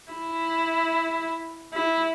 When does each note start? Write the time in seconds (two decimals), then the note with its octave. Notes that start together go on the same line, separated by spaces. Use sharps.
0.12 E4
1.74 E4